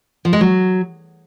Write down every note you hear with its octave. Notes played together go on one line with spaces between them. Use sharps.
F3
G#3
F#3